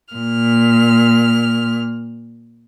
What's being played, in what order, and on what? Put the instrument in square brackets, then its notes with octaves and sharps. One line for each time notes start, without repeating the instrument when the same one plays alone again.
[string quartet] A#2 F6